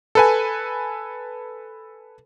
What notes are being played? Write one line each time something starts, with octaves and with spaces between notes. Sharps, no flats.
A4 B4 G#5